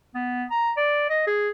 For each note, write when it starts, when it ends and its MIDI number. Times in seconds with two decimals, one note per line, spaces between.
0.15 0.45 59
0.51 0.71 82
0.77 1.05 74
1.09 1.25 75
1.27 1.49 68